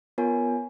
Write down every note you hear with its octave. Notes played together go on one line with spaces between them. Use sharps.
B3 F4 A#4 C#5 G#5